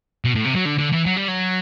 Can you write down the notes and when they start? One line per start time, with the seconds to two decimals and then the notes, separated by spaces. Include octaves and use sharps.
0.25 B2
0.35 A2
0.45 C3
0.55 F#3
0.65 D3
0.78 D3
0.92 E3
1.06 F#3
1.16 G3
1.28 F#3